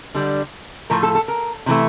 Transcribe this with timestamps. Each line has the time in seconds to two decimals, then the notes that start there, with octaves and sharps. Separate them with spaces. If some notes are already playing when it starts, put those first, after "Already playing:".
0.15 D3 G3
0.90 A2 F3 A3 A#4
1.03 A4
1.15 A4
1.28 A#4
1.66 C3 E3 A3